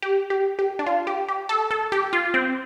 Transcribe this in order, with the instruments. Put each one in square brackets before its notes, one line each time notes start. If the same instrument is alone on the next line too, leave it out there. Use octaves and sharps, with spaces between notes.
[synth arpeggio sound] G4
G4
G4
D4
F4
G4
G4
A4
A4
G4
F4
C4